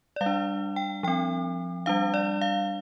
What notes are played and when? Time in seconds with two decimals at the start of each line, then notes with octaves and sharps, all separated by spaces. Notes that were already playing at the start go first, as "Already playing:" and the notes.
0.16 D5
0.21 G3 F5
0.26 D4
0.76 G5
1.03 F3 C4 G5
1.86 G3 D4 F5
2.14 D5
2.41 F5